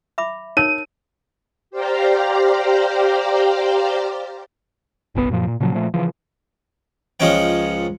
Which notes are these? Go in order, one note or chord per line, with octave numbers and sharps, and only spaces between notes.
E5 B5 D6
D#4 A#4 C#5 D#7
G4 C5 D5 F5 G5 A#5
F#1 B1 B2 B3
F#2 A#2 F3
A#2
A#2 C#3 F3 F#3
A#2 F3 A3
C#3 E3 F3
C#2 F3 G#3 C#4 C#5 G5